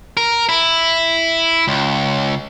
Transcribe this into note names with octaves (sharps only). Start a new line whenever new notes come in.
A#4
E4
C#2